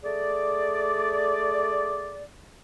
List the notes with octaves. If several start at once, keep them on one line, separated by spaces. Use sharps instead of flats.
A3 G#4 D5